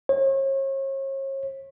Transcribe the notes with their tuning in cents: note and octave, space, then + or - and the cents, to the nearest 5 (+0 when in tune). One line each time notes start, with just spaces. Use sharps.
C#5 -40